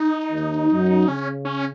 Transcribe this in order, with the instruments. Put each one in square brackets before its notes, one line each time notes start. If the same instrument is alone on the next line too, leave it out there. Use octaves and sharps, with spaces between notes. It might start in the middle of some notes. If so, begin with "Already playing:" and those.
Already playing: [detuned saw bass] D#4
[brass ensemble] D#2 D#3
F#2 F#3
[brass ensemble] C#3 [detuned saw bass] C#4
[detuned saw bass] C#4